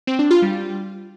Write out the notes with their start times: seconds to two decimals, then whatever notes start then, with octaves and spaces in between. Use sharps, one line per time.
0.07 C4
0.19 D4
0.31 F4
0.42 G3